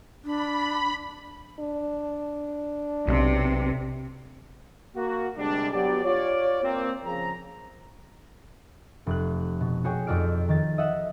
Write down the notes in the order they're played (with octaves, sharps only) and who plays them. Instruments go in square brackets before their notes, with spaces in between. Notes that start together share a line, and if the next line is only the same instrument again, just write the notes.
[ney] D4 [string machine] B5
[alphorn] D4
[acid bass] B1 [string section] C3
[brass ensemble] A#3 F#4
D2 C3 G3 G#3 D4
F#3 B3 G4 D5
F4 C#5 D5
A#3 C4
C#3 F3 A#5
[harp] F1 F#6
B2
F#4 G#4 C#5 G5
F2 D#4 F#4 D5 F6 D7
D#3 A6
D#5 E5 F#5